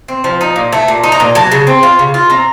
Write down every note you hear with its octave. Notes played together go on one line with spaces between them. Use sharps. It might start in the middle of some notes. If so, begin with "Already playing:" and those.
C4
F3
D#4
A#2
A3
A#2
D#4
A#5
A#2
F#3 A5
C#3
C4
F4
C#3
F4
C4 A#5